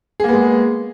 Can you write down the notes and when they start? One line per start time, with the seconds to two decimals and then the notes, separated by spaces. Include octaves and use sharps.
0.20 G#4
0.24 A#3
0.28 B3
0.33 G#3